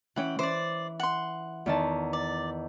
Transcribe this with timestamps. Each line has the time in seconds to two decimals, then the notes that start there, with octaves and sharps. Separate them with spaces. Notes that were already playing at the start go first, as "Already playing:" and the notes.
0.16 E3 C#4 F#5 G5
0.39 E3 C5 D5 D6
1.00 F#5 C6
1.66 E2 D#3 A5
2.13 D5